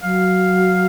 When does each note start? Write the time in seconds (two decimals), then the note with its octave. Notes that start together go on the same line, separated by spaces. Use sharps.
0.02 F#3 F5